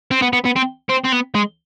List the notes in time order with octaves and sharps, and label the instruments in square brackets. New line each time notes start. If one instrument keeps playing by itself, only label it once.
[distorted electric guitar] C4
B3
B3
B3
C4
C4
C4
B3
G#3